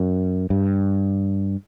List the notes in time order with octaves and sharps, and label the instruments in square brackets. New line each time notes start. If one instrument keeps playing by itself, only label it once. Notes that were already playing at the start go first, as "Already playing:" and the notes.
Already playing: [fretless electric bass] F#2
G2